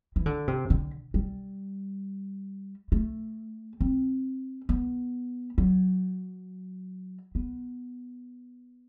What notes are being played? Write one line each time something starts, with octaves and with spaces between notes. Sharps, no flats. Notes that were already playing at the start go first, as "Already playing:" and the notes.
E3
D3
C3
D3
G3
A3
C4
B3
F#3
B3